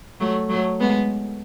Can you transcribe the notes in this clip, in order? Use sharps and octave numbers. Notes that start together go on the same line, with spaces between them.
F#3 A3
F#3 A3
G#3 B3